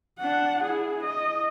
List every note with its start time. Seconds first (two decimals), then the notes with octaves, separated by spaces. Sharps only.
0.19 D4 F#5
0.64 E4 G#4
1.04 D#5